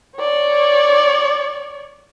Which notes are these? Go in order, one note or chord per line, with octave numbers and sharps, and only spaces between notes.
C#5 D5